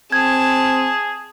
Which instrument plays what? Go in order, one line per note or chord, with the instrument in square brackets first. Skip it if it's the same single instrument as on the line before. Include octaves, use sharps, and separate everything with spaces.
[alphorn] C4 [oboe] G#4 [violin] A5 [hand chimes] G#6